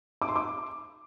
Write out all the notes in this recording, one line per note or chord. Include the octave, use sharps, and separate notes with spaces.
D6
C6
D6